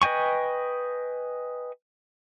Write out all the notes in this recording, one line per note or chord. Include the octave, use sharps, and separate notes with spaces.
B4 D#5 G5 G#5 C#6